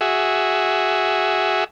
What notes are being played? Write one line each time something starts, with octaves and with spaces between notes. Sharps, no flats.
F#4 G#4 E5